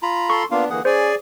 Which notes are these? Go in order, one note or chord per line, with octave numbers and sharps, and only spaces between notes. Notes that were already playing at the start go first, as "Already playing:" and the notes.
F4 A#5 B5
A4 C6 C#6
A#3 B3 D4 F4 F5
D3 E3 A#3 G#4 F#5
C#4 G#4 C5 D5 G#5